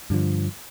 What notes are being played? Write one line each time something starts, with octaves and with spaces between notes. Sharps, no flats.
G2 D3 F3